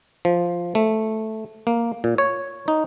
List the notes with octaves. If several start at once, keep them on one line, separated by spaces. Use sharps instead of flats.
F3
A3
A#3
A#2
C#5
D#4